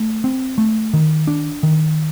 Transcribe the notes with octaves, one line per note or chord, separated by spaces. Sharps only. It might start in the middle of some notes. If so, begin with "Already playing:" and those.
Already playing: A3
C4
A3
D#3
D4
D#3